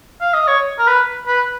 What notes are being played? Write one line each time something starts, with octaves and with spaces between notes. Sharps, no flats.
F5
D#5
C#5
A#4
B4
B4